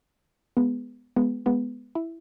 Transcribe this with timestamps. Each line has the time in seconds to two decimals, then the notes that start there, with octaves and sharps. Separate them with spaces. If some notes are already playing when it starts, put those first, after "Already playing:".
0.57 G#3 B3
1.16 G#3 B3
1.46 G#3 B3
1.95 E4